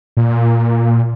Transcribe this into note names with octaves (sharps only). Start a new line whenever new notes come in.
A#2